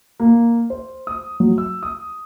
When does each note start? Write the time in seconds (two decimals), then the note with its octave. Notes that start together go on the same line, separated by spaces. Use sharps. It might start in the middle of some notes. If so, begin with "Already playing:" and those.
0.20 A#3
0.70 C5
1.07 D#6
1.40 F#3
1.58 E6
1.83 D#6